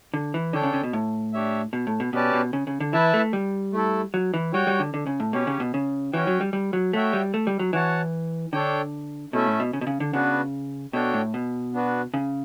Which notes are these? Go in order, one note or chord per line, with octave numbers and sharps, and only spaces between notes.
D3
E3
D3 D4 A4 C#5 G5
C#3
C#3
B2
A2
D4 G4 C#5 E5
B2
A2
B2
B2 C#4 G4 B4 D5 A5
B2
C#3
C#3
D3
E3 E4 B4 E5 A5
A3
G3
A3 E4 A4
F#3
E3
G3 F#4 C#5 G5
G3
D3
D3
C#3
A2
B2 C#4 G4 C#5
C#3
B2
C#3
E3 C#4 F#4 C#5 G5
F#3
G3
G3
F#3
A3 F#4 C#5 E5 G5
G3
A3
G3
F#3
E3 F#4 C#5 F#5 A5
D3 D4 A4 C#5 G5
B2 A3 C#4 E4 A4 E5
A2
B2
C#3
B2
C#3
D3
C#3 B3 D4 F#4 B4
B2 D4 F#4 A4 C#5 G5
A2
B2
B3 D4 F#4 B4
C#3